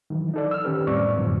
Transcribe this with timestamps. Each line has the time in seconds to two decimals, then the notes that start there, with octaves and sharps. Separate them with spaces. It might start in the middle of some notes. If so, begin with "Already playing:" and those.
0.10 D#3 E3 F#3
0.34 D#4 A4 D5
0.51 E6 F6
0.65 D#3 C#4 G4 B4
0.87 F2 A2 G3 C4 D5 C#6
1.16 F#2 A2 D3 F3